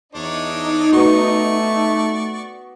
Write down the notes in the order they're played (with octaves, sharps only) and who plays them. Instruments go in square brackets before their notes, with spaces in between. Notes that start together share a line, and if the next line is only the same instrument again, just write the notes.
[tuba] E2 [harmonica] D4 C#5 D6 [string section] D#4
[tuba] A3 [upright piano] B3 F#4 [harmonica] D5 C#6